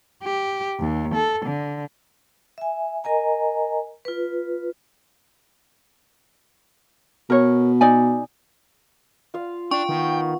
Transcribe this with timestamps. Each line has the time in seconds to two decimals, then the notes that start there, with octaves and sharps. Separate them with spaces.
0.23 G4
0.79 D#2
1.14 A4
1.45 D3
2.58 E5 G#5
3.04 A#4 D#5 G#5 A#5
4.05 F4 B4
7.30 B2 A#4 C#5
7.81 D#4 D5 G#5
9.34 F4 F5
9.71 D4 G5 C#6
9.89 D#3 B3